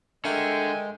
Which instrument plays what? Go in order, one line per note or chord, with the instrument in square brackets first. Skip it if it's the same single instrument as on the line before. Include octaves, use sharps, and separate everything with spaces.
[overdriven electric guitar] D3 [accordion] G#3 [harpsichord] A3 A#4 E5 [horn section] G5 G#5